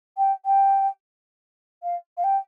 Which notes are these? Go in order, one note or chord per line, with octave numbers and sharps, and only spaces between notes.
G5
G5
F5
F5
G5